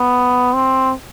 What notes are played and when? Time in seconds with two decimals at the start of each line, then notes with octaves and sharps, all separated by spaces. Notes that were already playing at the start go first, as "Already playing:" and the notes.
Already playing: B3
0.54 C4